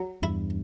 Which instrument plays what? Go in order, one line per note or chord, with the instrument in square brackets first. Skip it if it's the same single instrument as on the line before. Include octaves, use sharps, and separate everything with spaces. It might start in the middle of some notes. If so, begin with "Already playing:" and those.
Already playing: [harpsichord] F#3
[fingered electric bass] E2 G2 [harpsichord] E4